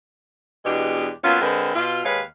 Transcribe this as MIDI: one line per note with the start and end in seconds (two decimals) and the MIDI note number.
0.65 1.08 40
0.65 1.08 47
0.65 1.08 56
0.65 1.08 62
0.65 1.08 67
1.23 1.40 54
1.23 1.40 58
1.23 1.40 59
1.23 1.40 61
1.23 1.40 65
1.40 1.73 50
1.40 1.73 56
1.40 1.73 60
1.40 1.73 70
1.40 1.73 71
1.74 2.02 47
1.74 2.02 65
2.04 2.21 39
2.04 2.21 56
2.04 2.21 71
2.04 2.21 73
2.04 2.21 77